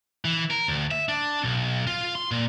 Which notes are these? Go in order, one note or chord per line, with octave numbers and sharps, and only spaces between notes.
E3
A#4
D2
E5
D4
B1
F4
C6
A#2